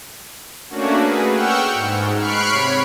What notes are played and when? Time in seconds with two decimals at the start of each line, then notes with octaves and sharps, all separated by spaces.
0.69 A3 A#3 C#4 D4 F#4
0.99 G#4 B4
1.31 F#5 G5 C#6 E6 F6 G6
1.73 G#2
2.18 B5 C#6 F6 F#6 C7 D7
2.49 C3 C#5 B5